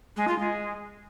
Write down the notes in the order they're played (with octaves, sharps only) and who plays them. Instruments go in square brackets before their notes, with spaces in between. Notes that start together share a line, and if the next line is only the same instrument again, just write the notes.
[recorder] G#3
F4
G#3